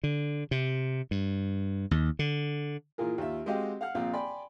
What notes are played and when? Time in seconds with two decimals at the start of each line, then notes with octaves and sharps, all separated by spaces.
0.03 D3
0.51 C3
1.11 G2
1.91 D#2
2.19 D3
2.98 A#2 E3 F4 G#4 A#4
3.18 D#2 F4 E5
3.46 G#3 C4 F#4 G4 D#5 F5
3.81 F5 F#5 F6
3.95 A#1 A#2 C4 F5
4.13 D5 G5 G#5 B5 C6